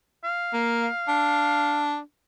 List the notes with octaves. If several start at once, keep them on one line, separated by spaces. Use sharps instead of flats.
F5
A#3
D4